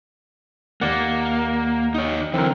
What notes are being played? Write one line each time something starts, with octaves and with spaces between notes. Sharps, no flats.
D#2 A#3 D5 F#5
D#4 C#5
D3 E3 C4 A#4